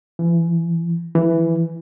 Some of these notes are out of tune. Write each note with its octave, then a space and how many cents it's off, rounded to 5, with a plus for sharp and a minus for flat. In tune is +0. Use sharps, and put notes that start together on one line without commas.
E3 +30
E3 +5